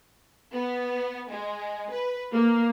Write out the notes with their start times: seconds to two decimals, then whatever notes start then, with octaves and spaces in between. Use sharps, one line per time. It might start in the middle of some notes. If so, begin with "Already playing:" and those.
0.52 B3
1.30 G#3
1.94 B4
2.33 A#3